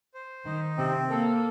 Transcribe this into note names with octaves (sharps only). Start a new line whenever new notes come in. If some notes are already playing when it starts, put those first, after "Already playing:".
C5
D#3 D#4
C3 C4
A#3 A4